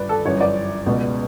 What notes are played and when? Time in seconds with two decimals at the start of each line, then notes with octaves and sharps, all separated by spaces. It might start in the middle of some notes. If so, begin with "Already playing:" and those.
Already playing: G1 B4 D5
0.09 A4
0.25 G1 F#2 E3 C#5
0.40 D5
0.86 C#2 B2